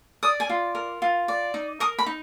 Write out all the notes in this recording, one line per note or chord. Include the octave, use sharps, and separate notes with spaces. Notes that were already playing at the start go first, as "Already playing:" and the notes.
D5 D#6
G#5
F4
A#4
F4
D5
D#4
A#4 D#6
B5
D#4